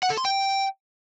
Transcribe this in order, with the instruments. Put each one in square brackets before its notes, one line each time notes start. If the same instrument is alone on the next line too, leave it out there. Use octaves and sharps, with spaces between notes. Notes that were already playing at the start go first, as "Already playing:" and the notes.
[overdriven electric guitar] F#5
A4
C6
G5